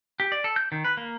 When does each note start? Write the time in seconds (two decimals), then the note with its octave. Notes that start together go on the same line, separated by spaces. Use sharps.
0.20 G4
0.32 D5
0.44 A4
0.56 G6
0.72 D#3
0.85 B4
0.97 A#3